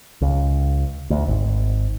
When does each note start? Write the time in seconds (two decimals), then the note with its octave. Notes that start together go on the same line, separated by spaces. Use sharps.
0.21 C#2
1.10 D2
1.28 G#1